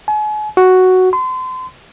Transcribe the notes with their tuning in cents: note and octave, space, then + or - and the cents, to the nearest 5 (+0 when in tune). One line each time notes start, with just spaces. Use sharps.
G#5 +40
F#4 +5
C6 -35